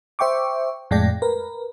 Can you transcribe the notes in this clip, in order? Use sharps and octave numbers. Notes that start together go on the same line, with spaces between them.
C5 E5 G5 C#6 D6
F2 A2 G#3 D5 G5 A#6
A#4 B4